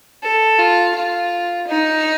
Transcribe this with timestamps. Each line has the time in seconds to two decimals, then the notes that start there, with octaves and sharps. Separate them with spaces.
0.23 A4
0.59 F4
0.95 F4
1.67 D#4